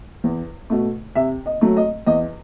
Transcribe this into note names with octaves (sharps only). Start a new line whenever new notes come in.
E2
B2 A3
C3 E5
D#5
F#3 A3
D#5
E2 D#5